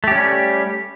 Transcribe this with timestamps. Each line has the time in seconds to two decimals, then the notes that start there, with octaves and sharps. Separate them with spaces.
0.04 A3
0.08 G4
0.11 C#4
0.15 G3